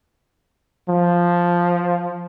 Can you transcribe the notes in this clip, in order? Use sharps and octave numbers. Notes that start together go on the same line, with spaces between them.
F3